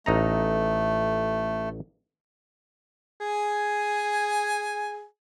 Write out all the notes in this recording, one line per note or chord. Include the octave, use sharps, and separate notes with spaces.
A1 A3 D#4 A#5
G#4 G#5